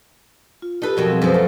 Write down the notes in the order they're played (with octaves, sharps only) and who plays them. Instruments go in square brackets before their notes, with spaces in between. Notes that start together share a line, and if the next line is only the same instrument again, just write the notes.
[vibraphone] F4
[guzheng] D#4 A4 B4 [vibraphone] G4
[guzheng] F2 B2 F#3 [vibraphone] A#4
[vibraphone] G3 C4 G#4
[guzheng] F#2 F3 [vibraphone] B4 C5
[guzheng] A3